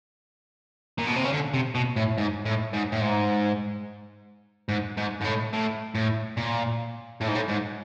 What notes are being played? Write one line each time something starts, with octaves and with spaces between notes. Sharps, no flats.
A#2
B2
C3
C#3
D3
C3
B2
A2
G#2
A2
G#2
A2
G#2
G#2
G#2
G#2
A2
A2
A2
A#2
A2
G#2
A2
G#2